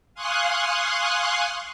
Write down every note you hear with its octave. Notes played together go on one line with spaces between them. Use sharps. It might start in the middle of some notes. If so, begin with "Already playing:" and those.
F5 G#5 C6 C#6 D#6 F#6